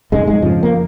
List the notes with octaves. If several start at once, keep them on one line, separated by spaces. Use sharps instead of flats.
F2 G#2 C#3 G#3
G#2 G#3
F2 C#3 F3
A#3